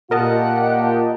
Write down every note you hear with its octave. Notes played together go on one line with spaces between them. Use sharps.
A#2 F4 G4 A#4 D#5 F#5 A5